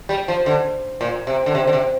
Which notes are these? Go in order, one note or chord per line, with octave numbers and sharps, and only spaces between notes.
G3
F3
D3
A#2
C3
D3
C3
D3
C3